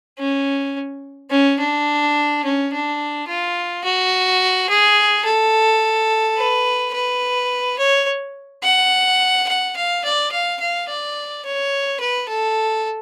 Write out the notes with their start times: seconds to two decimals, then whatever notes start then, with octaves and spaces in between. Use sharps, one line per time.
0.19 C#4
1.31 C#4
1.59 D4
2.44 C#4
2.72 D4
3.28 F4
3.84 F#4
4.69 G#4
5.25 A4
6.37 B4
6.94 B4
7.78 C#5
8.63 F#5
9.48 F#5
9.76 F5
10.04 D5
10.32 F5
10.61 F5
10.89 D5
11.45 C#5
12.00 B4
12.28 A4